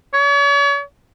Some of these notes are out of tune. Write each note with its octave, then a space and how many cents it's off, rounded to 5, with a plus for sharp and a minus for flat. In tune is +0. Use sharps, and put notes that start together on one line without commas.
C#5 +40